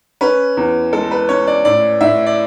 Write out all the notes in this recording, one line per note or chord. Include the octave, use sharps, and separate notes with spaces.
C#4 B4
E2
G#3 A4
B4
C#4 C#5
D5
A2 D5
A2 E5
D5